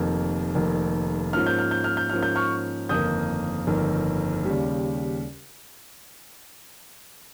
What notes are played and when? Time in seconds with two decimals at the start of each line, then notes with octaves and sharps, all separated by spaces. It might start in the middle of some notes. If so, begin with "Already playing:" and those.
Already playing: F1 F2 D#3 A#3
0.55 F1 F2 D#3 A#3
1.33 G#2 F3 A#3 C#4 F6
1.46 G6
1.59 F6
1.71 G6
1.84 F6
1.97 G6
2.10 G#2 F3 A#3 C#4 F6
2.23 G6
2.36 C#6 F6
2.89 G1 F2 D#3 A#3 D#6 G6
3.67 G1 F2 D#3 A#3
4.45 D#2 C#3 G3